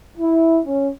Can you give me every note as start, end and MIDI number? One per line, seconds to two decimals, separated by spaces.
0.18 0.59 64
0.66 0.88 61